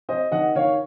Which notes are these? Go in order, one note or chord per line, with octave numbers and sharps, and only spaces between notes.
C4 C5 D#5
D#3 D#5 F#5
D#3 C#5 F5